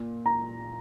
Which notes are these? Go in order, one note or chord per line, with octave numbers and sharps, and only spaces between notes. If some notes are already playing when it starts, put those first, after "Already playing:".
Already playing: A#2
A#5